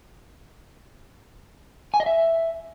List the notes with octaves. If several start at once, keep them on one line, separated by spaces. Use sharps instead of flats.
G#5
D#5
E5